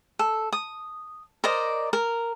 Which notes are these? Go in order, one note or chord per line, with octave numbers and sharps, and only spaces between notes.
A4
D#6
A#4 C5 D5 D#5
A#4